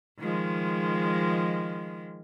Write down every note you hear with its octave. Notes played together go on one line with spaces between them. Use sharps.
D#3 F3 G#3